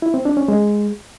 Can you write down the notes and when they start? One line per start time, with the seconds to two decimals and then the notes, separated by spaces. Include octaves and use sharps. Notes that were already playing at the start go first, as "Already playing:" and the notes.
0.02 E4
0.14 C4
0.25 D4
0.37 C#4
0.48 G#3